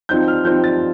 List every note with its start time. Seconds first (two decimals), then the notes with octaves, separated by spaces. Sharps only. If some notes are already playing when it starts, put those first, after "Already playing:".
0.09 F3 C4 D#4 G6
0.28 F6
0.45 F3 C4 D#4 G6
0.64 A6